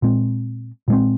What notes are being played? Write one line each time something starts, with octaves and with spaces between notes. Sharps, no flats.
A#2 G#3 C4
A#2 G#3 C4